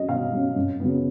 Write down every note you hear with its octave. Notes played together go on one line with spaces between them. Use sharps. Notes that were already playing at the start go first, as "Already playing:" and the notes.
Already playing: F#3 C#4 D#5
B2 F5
F#3 C#4
F#2
C#3 F#3 B3